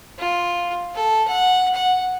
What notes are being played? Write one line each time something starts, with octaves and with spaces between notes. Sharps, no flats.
F4
A4
F#5
F#5